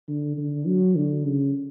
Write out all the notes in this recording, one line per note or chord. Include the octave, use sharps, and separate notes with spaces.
D3
D3
F#3
D3
C#3